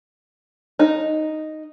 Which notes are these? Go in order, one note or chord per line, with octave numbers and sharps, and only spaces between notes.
D#4